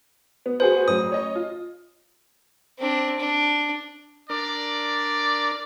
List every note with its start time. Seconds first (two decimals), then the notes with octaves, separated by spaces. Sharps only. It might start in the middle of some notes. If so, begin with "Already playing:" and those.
0.46 B3
0.60 F#4 G#4 B4 C5
0.88 A1 F#3 D#6
1.12 C#5 D#5
1.35 F4
2.78 C4 D4
3.19 D4
4.30 D4 A#4 D5